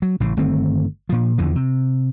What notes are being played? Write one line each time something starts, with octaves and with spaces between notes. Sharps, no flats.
F#3
A1 A2 C#3
G1 D#3 A3 C4
A#2 F3
E2 D3 E3 F3
C3